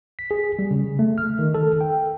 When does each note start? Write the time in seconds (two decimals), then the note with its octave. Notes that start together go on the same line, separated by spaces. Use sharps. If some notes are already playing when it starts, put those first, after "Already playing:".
0.19 B6
0.31 G#4
0.59 G3
0.71 C#3
0.99 A3
1.18 F6
1.39 D#3
1.54 A4
1.81 G5